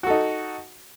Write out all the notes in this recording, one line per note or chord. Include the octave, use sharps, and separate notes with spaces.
D#4 F#4 A4